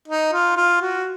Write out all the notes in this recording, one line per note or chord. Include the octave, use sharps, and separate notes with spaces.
D#4
F4
F4
F#4